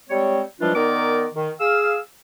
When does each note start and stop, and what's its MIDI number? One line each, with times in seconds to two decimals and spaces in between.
0.10 0.41 55
0.10 0.41 56
0.10 0.41 60
0.10 0.41 73
0.61 0.73 52
0.61 0.73 53
0.61 0.73 55
0.61 0.73 56
0.61 0.73 62
0.61 0.73 65
0.75 1.26 51
0.75 1.26 59
0.75 1.26 63
0.75 1.26 70
0.75 1.26 74
0.75 1.26 86
1.35 1.51 51
1.60 1.98 68
1.60 1.98 77
1.60 1.98 88